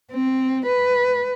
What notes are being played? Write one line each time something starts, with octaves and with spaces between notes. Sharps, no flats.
C4
B4